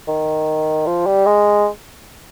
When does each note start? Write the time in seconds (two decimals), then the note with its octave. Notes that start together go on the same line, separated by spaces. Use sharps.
0.08 D#3
0.87 F3
1.06 G3
1.26 G#3